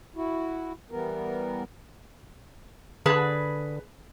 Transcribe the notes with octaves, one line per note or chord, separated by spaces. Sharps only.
E4 F#4
E3 G3 B3 A#4
D3 G#4 B4 A5